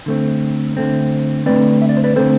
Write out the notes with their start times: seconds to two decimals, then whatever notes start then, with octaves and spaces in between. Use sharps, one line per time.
0.06 D3 A3 C4
0.77 D3 A3 C4
1.46 D3 A3 C4 B4 D5
1.81 E5
1.89 D5
1.97 C5
2.04 B4 D5
2.16 D3 A3 C4 A4 C5